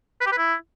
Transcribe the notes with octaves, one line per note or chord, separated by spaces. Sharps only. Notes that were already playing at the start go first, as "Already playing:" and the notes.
B4
G4
B4
E4